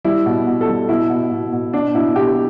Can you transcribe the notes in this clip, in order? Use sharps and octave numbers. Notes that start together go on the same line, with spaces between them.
G3 E4
B2
B2
A4
G3
B2 E4
B2
B2
B2
B2 D4
B2 E4
B2 G4